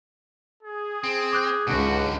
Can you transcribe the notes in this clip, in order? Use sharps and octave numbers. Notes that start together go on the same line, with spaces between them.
G#4
C4
D6 F#6 G6
C#2 G#2 D3 F#4